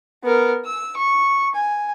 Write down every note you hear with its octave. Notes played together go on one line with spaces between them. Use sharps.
B3 A#4
E6
C#6
G#5